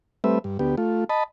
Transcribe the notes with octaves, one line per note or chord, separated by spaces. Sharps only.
G3 A3 C4 B4 E5
G2
D2 B3 G4
A3 F4
D#5 A5 B5